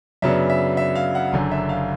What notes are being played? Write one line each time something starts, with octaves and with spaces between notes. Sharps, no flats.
F#2 C#3 F#3 B3 D4 E5
E5
E5
F5
F#5
F#1 F#2 D3
E5
F5